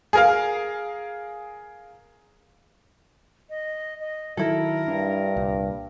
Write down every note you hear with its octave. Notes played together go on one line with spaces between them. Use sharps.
G#4 A#4 F5
D#5
D#5
D#3 F#3 E4 A4 A#4
G2 D4
C2 A#2